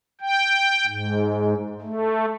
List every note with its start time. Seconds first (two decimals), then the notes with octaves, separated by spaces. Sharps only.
0.21 G5
0.87 G#2
1.82 A3